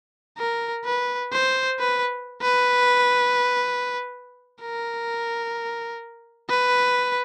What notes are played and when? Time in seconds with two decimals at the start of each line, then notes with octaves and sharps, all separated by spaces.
0.38 A#4
0.85 B4
1.32 C5
1.79 B4
2.42 B4
4.61 A#4
6.50 B4